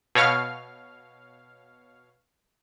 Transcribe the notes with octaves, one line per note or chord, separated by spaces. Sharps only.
B2 C#5 F5 F6